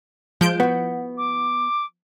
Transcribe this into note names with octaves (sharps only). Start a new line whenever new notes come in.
F3 G#3 G6 D7
B3 E4 F#4
D6